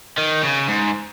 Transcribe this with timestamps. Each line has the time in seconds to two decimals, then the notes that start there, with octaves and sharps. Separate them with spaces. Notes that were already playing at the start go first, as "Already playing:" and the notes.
0.18 D#3
0.43 C#3
0.68 G#2